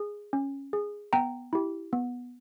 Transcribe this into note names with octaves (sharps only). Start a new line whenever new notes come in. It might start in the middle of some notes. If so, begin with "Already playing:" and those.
Already playing: G#4
C#4
G#4
B3 G5 A#5
E4 G4
B3